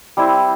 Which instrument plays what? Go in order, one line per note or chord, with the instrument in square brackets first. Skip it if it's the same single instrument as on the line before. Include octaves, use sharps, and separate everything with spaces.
[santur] G3 C4 E4